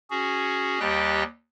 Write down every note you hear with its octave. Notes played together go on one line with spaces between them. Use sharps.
C#4 F#4 G#4
D#2 G3 G4 D#5 G5 F#6